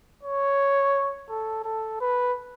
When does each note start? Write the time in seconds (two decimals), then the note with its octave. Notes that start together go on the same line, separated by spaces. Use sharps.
0.23 C#5
1.29 A4
1.64 A4
2.01 B4